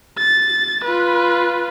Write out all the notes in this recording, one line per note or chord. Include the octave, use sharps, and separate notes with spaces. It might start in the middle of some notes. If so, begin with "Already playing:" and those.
A6
F4 B4